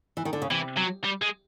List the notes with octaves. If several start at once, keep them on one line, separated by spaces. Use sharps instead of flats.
E3
D#3
D3
C#3
C3 E3
F#3
G3
G#3